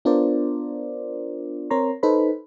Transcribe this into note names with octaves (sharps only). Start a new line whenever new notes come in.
B3 D4 F4 A#4 C5 D5
C4 A#4 C#5 A#5 C6
D#4 A4 B4 C5 B5